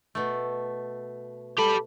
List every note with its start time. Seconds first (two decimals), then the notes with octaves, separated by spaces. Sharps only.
0.15 B2 A3
1.58 G4 A4 B5